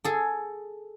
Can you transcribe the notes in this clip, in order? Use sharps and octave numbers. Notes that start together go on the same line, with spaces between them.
G#4 A4